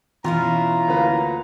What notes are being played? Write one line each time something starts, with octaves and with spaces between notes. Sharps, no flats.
B2 E3 C#4 E4 F4 A#5
D2 A#3 B4